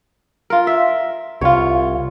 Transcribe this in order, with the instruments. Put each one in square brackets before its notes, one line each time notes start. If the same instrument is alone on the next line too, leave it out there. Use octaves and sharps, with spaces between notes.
[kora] F4 A#4
E5
[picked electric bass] C2 [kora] F4 C#5